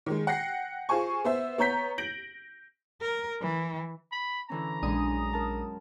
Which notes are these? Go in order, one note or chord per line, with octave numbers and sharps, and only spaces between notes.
D#3 G#3
F#5 G5 A#6 C7
F4 G#4 C5 G#5 C#6
B3 C5 E5
B3 C#5 A#5 G6 B6
G6 A#6 D7 F#7
A#4
E3
B5
D3 E3 C#4 A#5
A#1 F#2 G#3 D4 G#5 D#6
A#4 A5